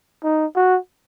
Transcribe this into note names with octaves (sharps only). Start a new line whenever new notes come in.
D#4
F#4